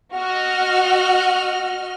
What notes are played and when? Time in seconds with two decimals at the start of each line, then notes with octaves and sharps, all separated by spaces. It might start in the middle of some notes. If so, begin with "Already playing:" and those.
0.16 F#4 D#5 F6